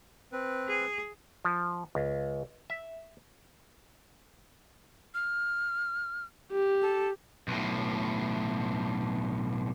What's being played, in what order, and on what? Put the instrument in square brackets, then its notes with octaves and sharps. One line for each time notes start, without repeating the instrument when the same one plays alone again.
[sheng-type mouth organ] C4 B4
[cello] G#4
[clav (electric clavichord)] F3
C#2
E5
[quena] F6
[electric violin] G4
[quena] A4
[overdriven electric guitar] B1 A2